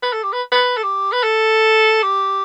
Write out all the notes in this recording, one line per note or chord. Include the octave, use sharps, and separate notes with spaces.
B4
A4
G4
B4
B4
A4
G4
B4
A4
G4